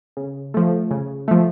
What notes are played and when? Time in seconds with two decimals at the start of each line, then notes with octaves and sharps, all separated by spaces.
0.17 C#3
0.54 F3 A3
0.91 C#3
1.28 F3 A3